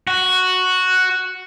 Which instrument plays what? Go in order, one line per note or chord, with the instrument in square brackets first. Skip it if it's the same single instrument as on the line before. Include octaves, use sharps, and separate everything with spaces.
[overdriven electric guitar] F#4